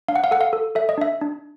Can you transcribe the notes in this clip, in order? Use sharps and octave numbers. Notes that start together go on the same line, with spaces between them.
D4 F5
F#5
F5
A4 F#5
F5
A4
A4 E5
D#5
D4 E5
D4